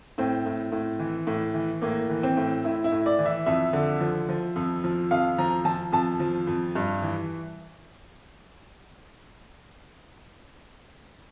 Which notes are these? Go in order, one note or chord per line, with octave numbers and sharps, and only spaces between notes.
A2 C4
A2
A2
E3
A2
E3
A2 A#3
E3
C4
A2
A2 E4
E4
A2
D5
E3
E5
F2 E5
D3
F3
F3
F2
F3
F2 F5
F3 A#5
F3 A5
F2 A5
F3
F2
G2
E3